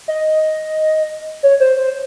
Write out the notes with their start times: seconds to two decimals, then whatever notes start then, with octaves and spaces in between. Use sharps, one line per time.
0.08 D#5
1.43 C#5
1.60 C5
1.77 C5